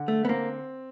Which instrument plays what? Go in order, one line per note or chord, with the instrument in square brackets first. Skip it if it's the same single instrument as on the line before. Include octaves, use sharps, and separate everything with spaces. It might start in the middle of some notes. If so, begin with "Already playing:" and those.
Already playing: [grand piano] D3
[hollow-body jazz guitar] A3
B3
[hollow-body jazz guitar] A#3 [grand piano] C4